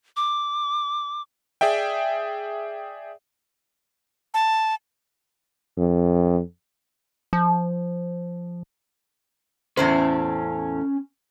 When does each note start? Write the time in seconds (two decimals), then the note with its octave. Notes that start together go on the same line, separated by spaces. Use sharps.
0.16 D6
1.61 G#4 D5 E5 G5
4.34 A5
5.78 F2
7.33 F3
9.77 E2 A2 C#4 C5 B5